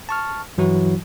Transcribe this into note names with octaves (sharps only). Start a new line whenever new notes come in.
A5 C#6 F6
G2 E3 F#3 E4 F#4